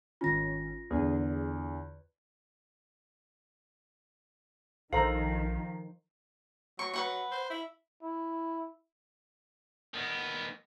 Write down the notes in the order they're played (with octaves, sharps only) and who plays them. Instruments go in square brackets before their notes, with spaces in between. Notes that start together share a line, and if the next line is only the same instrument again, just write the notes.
[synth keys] G#1 D#3 C#4 [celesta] F4 A#6
[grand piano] E2 D3 [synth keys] G#4
[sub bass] A#1 [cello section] D#3 F3 [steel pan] A4 C5 A#5 [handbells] F5
[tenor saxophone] F#3 [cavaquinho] C#6
[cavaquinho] B4 F#5 C#6
[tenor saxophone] C5
E4
[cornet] E4
[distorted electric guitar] D#3 B3